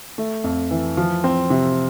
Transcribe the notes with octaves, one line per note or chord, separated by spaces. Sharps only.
A3
F2
E3
F3
C4
C3